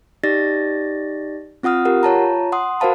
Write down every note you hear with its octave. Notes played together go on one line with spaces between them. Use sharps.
D#4 G4 D5 A6 A#6
C4 F4 F#5 D#6 F6
F4 G4 A#4 F#5
F4 C#5 A5 A#5
F#5 C6 D#6
F#4 A#4 C5 F5 A5 B5